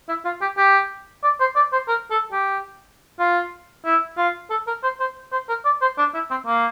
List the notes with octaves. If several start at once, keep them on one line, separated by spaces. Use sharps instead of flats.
E4
F4
G4
G4
D5
C5
D5
C5
A#4
A4
G4
F4
E4
F4
A4
A#4
C5
C5
C5
A#4
D5
C5
D4
E4
C4
A#3